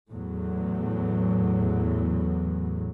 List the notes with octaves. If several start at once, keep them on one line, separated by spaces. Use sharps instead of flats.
E2 A2 F#3